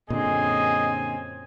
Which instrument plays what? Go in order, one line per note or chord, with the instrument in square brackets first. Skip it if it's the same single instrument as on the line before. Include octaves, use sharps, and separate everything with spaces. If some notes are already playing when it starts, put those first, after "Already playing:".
[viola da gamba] F#2 C4 [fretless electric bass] A#2 D3 [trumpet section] G#4 D#5 [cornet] G#5